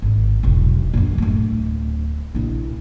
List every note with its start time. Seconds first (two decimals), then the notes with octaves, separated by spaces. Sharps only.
0.02 G#1
0.43 E1 B1
0.94 A#1 F#2
1.18 D1 A3
2.35 A#1 E4